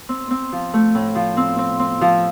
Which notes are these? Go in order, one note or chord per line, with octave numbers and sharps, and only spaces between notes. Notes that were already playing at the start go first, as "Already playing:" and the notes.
C4
C4
F3
A3
A2
F3
C4
C4
C4
F3